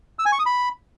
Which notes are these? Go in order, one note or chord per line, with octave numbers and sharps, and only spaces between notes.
E6
G#5
C#6
D#6
B5